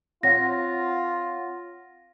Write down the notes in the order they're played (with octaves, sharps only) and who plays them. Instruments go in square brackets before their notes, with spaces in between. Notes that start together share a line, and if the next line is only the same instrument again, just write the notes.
[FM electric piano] C4 C#5 F#5 [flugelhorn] F4 [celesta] A#6